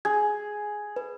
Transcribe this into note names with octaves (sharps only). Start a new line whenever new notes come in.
G#4 G#6
B4